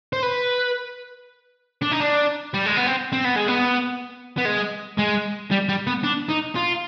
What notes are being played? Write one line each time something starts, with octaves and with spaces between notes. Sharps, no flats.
C5
B4
D4
D#4
D4
G3
G#3
B3
C4
C4
B3
G#3
B3
B3
G#3
G#3
G3
G3
B3
D4
D#4
F4